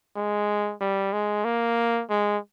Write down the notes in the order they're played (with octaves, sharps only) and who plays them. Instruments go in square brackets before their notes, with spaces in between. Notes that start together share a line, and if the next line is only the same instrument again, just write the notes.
[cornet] G#3
G3
G#3
A#3
G#3